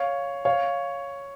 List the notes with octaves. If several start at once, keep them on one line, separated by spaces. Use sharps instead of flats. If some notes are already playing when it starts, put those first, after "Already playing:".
Already playing: C#5 F5
C#5 F5